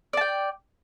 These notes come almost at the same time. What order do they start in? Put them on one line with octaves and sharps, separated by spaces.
D5 A5 G5